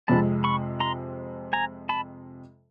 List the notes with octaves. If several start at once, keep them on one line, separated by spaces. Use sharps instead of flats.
F2 C3 F3 G#3 C4 A5 B5
B5 C#6
A#5 C6
G#5 A#5
A5 B5